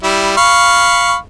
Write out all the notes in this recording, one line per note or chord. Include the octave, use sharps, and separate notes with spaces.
G3 E4
F5 B5 C#6